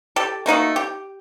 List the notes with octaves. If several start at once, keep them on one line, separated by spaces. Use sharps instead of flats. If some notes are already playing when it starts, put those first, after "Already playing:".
G4 A4
A3 A#3 D#4 F#4
G4